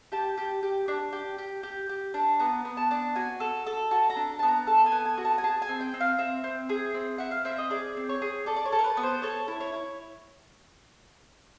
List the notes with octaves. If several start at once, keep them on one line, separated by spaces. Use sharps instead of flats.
G4 A5
G4
G4
D4
G4
G4
G4
G4
D4
B3 A#5
B3
A5
D4
F#4 G#5
A4
A4
F#4 A5
A#5
D4
B3 A5
A#5
A4 A5
G#5
B3
G#5
F#4
A5
G#5
G#4 A5
G#5
C4
G5
C4
F5
C4 E5
C4
G#4
C4
E4 F#5
F5
C4 E5
D#5
G#4 D5
C4
C#5
G#4
A4 D5
D5
C#5
A4
A#4
B4
B3
C5
A4 C#5
E4
C#5
E4